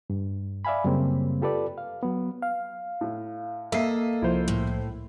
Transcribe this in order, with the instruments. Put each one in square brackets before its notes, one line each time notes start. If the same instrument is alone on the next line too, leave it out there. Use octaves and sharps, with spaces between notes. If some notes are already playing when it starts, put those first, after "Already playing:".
[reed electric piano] G2
D5 E5 F5 G#5 B5
F#2 C#3 G3 A#3 C4
F4 G4 A4 B4 D5
F5
F#3 B3
[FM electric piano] F5
[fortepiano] A2
[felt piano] A#3 C7 [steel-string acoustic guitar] A4 D#5 [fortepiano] E5
[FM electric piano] C2 F3 [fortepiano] E4 C5
[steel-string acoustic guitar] A2